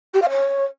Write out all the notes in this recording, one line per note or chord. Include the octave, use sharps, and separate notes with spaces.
G4
F5
C#5